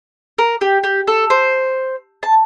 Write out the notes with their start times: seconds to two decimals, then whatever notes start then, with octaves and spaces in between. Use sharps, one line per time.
0.38 A#4
0.61 G4
0.84 G4
1.07 A4
1.30 C5
2.23 A5